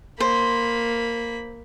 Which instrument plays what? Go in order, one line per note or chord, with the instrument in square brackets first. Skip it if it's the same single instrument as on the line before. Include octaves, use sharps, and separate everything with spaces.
[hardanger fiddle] A#3 B5 [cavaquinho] C5